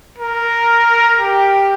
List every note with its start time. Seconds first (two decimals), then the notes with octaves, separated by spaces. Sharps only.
0.18 A#4
1.19 G4